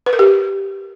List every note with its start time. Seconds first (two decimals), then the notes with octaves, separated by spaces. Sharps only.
0.06 B4
0.13 A#4
0.19 G4